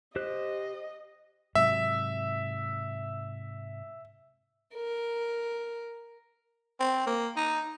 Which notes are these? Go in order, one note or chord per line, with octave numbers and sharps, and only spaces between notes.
G4 C5 D#5 F#6
G#2 C3 F#3 E5
A#4
C4
A#3
D#4